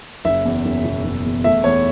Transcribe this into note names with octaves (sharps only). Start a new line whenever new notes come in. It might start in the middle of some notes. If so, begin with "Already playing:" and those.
F#1 E5
E2
F#1
B2
F#1
E2
A3 E5
E2 C#5